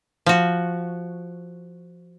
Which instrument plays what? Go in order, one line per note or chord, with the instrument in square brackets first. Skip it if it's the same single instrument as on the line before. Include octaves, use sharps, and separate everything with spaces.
[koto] F3 F#4